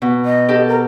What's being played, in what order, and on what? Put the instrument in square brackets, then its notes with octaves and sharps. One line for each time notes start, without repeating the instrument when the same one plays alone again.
[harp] B2
[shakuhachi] D#5
[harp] G4 A4
[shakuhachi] A#4